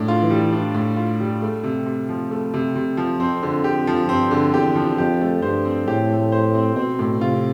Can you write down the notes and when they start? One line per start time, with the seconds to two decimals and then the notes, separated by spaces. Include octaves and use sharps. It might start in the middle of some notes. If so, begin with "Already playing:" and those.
Already playing: A2 D4
0.08 F4
0.23 E3
0.30 G3
0.53 D4
0.74 A2
0.97 F4
1.20 G3
1.42 A3
1.64 C3
1.86 C3
2.09 F3
2.31 A3
2.54 C3
2.75 C3
2.97 F3
3.19 F2 C4
3.43 D3
3.64 F2 G4
3.87 F3
4.09 G2 C4
4.31 D3
4.54 E2 G4
4.76 F3
4.98 F2 G4
5.21 A3
5.42 G2 C5
5.65 C4
5.87 A2 G4
6.10 A3
6.32 C5
6.55 C4
6.76 B2 C4
6.99 A2
7.21 C3 F4